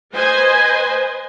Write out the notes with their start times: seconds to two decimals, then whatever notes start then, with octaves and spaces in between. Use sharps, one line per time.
0.13 B4 C5 D#5 G#5